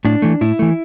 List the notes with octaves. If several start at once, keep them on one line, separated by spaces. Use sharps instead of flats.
A2 D4
E3 A3
A2 E4
E3 A3